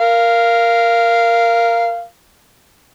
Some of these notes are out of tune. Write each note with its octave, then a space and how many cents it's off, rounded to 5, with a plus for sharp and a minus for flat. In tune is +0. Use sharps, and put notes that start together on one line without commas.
A#4 +0 F5 -15